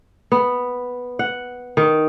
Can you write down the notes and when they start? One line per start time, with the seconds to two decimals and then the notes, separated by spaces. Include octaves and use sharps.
0.32 B3
1.19 F#5
1.77 D#3